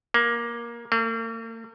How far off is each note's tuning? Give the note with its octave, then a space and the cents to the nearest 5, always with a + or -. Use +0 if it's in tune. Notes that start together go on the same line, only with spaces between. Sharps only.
A#3 +15
A#3 -45